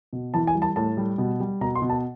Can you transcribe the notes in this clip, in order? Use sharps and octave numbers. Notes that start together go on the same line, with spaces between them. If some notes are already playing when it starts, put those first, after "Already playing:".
B2
E3 A5
G#5
G3
A5
A2 A5
G3
B2
G3
B2 A#5
C6
B2
A5